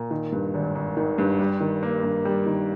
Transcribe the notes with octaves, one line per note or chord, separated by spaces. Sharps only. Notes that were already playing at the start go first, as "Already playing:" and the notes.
Already playing: A#2
D#3
G2
G#1
G#1
D#3
G2
G3
D#3
A#3
G2
G3
D#3